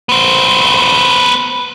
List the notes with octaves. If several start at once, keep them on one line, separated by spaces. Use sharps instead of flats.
B3 C5